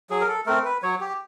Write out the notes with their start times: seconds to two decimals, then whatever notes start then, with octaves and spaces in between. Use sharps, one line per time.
0.10 F#3 G#4
0.21 A#4
0.28 A4
0.46 A3 C4 A#4
0.65 B4
0.83 F#3 C#5
1.01 G4